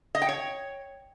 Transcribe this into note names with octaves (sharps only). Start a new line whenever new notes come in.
D#5
G5
C#5